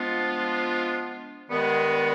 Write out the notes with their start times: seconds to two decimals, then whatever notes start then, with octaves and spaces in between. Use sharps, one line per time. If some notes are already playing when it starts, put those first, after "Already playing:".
Already playing: F3 G#3 B3 D4 F4
1.48 G2 D#3 G#3 B3